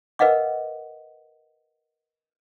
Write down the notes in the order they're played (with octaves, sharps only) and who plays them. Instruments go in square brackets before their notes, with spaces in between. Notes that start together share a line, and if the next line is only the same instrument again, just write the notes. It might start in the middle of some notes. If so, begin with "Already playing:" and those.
[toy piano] A#4 B4 D#5 F5 F#5 D6